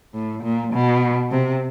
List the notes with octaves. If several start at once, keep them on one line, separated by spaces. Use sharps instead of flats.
A2
A#2
B2
C3